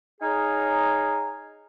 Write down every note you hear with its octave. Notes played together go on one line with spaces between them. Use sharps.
D#4 G#4 C#5 F5 G#5 A#5